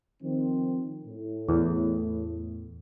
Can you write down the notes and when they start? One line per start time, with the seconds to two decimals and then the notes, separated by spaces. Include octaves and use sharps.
0.22 D#3 F3 C4
1.04 A2
1.49 E2